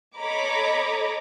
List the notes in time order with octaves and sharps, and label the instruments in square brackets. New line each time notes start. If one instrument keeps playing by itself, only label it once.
[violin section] A4 C#5 D#5 A#5 B5 D6